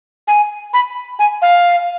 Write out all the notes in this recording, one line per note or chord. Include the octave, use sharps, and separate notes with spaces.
G#5
B5
G#5
F5